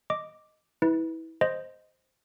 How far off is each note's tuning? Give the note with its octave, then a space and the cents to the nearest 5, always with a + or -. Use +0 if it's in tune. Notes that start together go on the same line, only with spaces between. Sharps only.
D#5 +0 D6 +0
E4 -25 B4 +0
C5 +0 D#5 +0